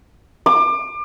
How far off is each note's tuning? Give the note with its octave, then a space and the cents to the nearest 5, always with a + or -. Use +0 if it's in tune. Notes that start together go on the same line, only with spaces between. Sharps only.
D6 +30